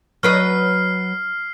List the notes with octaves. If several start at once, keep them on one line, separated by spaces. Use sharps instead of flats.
F#3 B4 D#5 F6 C7